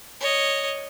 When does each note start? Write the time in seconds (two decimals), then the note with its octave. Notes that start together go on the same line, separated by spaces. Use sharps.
0.21 C#5 D#5